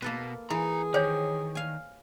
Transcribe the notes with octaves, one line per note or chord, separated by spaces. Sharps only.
B2 A#3 A4 B4
E3 E4 G#4 A#5
D#3 G4 C5 C#5
F5 G#5